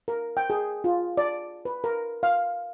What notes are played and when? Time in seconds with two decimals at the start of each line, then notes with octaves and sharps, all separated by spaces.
0.08 A#4
0.37 G5
0.50 G#4
0.84 F4
1.17 D5
1.65 B4
1.84 A#4
2.23 F5